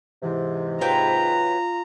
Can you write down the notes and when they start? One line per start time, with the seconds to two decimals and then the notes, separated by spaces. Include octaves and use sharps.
0.23 G#2 C3 E3
0.81 F#3 F4 B4 G5 A#5